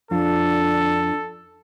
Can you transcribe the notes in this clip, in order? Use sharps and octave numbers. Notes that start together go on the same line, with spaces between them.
F2 D4 F4 A4